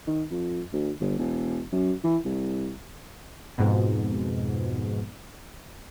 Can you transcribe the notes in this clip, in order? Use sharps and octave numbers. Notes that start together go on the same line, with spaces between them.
D#3
F2
D2
G1
E1
F#2
E3
C2
F2 G#2 B2